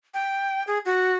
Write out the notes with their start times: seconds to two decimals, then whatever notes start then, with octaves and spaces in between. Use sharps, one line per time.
0.14 G5
0.67 G#4
0.85 F#4